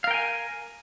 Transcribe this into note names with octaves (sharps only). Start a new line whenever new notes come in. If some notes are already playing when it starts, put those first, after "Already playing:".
A#4 F5 G5 G#5